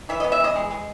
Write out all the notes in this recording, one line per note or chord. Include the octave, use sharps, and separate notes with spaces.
E3 E5
D#5
B3
E5
E3 D#5
G#3
G#3